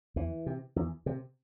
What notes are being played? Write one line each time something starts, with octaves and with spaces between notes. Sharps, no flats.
E2 E3
C3
E2
C3